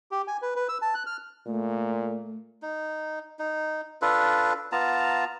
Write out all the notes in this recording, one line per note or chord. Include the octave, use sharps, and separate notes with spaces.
G4
G#5
B4
B4
E6
A5
F#6
F6
A#2 A3
D#4
D#4
D4 F4 A4 B4
B3 F4 A5 A#5